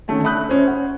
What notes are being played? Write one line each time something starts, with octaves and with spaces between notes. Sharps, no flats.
D3 D#3 A3 C#4
E5 B5 D#6 F#6 G6
C#4 C5
F#5